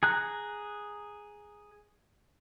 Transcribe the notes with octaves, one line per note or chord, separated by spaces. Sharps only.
G#4 A#5 F#6